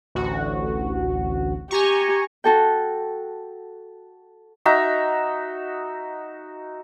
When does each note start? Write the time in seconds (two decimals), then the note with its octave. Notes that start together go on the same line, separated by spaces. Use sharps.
0.15 A1 D2 F#4
1.71 G4 G#5 A#5 C#6
2.44 F#4 A4 G5
4.66 D#4 F#4 E5 A#5